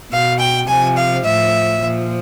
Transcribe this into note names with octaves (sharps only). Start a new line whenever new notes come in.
B2 F5
G5
C3 F3 G#5
F5
A2 F3 E5
A#2 F3